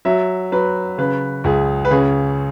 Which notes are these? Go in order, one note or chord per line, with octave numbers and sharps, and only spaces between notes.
F#3 E5
F#3 B4
C#3 B4
C#2 G#4
B4
C#3 G#4